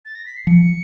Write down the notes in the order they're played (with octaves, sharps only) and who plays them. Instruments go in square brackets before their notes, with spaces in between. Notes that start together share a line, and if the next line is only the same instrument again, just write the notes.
[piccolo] A6
A#6
B6
C7
[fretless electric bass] F3 [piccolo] C#7